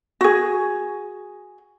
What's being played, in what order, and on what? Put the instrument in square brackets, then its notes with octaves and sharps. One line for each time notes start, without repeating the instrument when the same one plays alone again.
[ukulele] F#4 G#4